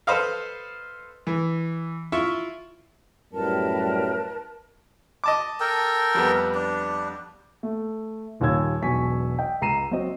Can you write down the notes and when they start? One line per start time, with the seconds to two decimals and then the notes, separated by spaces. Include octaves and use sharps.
0.07 A4 B4 C5 D#5 F5
1.27 E3
2.12 E4 F4 E5 C#6
3.33 F#2 A2 G3 A#4 B4 A5
5.24 D#5 A5 D6
5.60 A4 A#4 G5
6.15 F2 G3 B3
6.55 D4
7.63 A3
8.40 D#1 D#2 A#2 C#5 E6 G#6
8.82 E1 B1 B2 G#5 C#6 B6
9.39 D#5 G5
9.61 C#2 A#5 C7 D#7 E7
9.91 F#3 C4 D#5